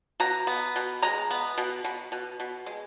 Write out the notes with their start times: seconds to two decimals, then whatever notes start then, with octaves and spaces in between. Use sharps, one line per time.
0.20 B2 A#5
0.47 B3
0.76 B2
1.02 G#3 A#5
1.31 B3
1.58 B2
1.85 B2
2.12 B2
2.40 B2
2.66 G#3